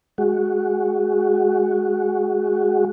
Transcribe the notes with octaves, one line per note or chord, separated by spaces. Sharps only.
G#3 F#4